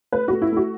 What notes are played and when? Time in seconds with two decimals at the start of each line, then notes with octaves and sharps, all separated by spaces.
0.12 A3 B4
0.28 A3 F#4
0.42 E4
0.52 A3 F#4